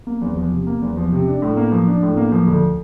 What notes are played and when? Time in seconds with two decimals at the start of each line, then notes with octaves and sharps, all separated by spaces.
0.07 A#3
0.21 E2
0.37 F3
0.52 C3
0.67 A#3
0.82 E2
0.97 F3
1.12 C3
1.27 D4
1.42 A2
1.57 A#3
1.72 F3
1.87 D4
2.03 A2
2.17 A#3
2.32 F3
2.47 D2